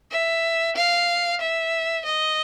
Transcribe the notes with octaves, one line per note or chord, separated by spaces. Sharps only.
E5
F5
E5
D#5